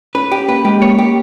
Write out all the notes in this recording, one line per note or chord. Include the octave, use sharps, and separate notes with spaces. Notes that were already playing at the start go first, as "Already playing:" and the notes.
C#4 B4
G4
A#3 B4
G#3 G4
A#3 C#5
G4